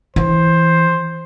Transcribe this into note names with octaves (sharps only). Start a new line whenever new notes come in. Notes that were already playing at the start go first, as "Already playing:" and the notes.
E3 C5